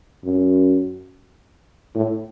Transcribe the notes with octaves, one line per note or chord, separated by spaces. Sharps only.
F#2
A2